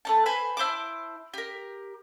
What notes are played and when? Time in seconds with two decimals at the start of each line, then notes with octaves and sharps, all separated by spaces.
0.05 A3 C#4 A5
0.26 B4 C5 G#5 B5
0.57 E4 C5 A5 D6
1.34 G4 A#4